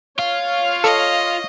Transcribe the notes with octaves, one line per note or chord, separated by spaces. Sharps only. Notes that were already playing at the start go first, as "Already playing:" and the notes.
F4 C#5 F5
A4 D#5